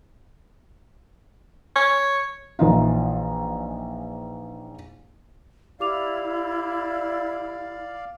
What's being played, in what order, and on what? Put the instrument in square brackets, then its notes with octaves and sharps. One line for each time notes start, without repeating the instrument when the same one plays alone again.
[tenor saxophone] C#5
[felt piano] A#1 E3 D#4 F4
[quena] E4 [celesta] G4 D6 F7 [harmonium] D5 F5